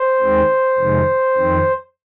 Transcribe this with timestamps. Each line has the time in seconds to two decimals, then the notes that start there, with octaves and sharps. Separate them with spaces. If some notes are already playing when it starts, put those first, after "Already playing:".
Already playing: C5
0.21 D#2 D#3 G#3 C4
0.78 F2 C3 D#3 G#3
1.36 F2 D#3 C4